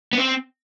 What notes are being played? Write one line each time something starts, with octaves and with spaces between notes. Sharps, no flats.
B3
C4